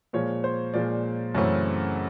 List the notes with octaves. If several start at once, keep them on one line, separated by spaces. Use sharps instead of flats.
A#2 F3 G#3 C#5
C5
A#2 F3 G#3 D5
F#2 C#3 E3 A3 C4